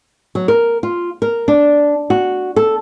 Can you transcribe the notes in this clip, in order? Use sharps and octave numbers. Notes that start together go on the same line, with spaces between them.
F#3
A#4
F4
A#4
D4
F#4
A4